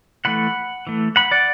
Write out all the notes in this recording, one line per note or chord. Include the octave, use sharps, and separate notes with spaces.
E3 A3 F#5 B5
E3 A3
F#5 B5
D5 F#5